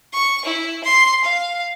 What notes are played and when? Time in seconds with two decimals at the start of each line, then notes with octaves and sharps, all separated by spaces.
0.13 C#6
0.45 E4
0.84 C6
1.24 F5